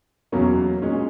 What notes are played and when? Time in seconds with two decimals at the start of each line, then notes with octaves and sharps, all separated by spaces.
0.32 E2 B2 F#3 A#3 C#4
0.82 A#2 G#3 C#4